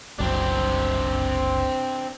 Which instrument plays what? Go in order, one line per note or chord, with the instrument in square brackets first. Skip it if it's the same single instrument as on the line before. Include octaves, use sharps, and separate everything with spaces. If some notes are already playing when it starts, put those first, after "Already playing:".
[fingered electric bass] F#1 C2 F#3 [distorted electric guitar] C4 D4